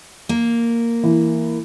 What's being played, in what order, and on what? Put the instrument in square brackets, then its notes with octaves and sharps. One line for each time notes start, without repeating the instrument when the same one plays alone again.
[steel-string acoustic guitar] A#3
[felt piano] E3